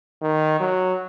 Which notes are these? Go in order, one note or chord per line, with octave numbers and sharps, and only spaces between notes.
D#3
F#3